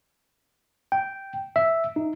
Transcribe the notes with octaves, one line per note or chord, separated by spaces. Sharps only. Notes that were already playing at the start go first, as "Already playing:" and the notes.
G5
E5
D#4